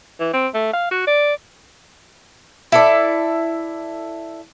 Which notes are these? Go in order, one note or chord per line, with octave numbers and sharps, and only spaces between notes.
E3
C4
A3
F5
F#4
D5
E4 A4 D5